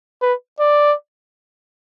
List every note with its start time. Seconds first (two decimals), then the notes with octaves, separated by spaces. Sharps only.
0.22 B4
0.60 D5